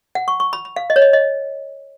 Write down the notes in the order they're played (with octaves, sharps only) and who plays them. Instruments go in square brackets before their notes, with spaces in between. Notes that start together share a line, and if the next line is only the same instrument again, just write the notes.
[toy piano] F#5
C#6
C#6
B5
B5
F5
D#5
C#5
D#5
D#5